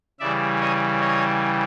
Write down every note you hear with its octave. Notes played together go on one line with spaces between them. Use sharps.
C#3 E3 G3 D5 E5
C#5 D#5
C#5 D#5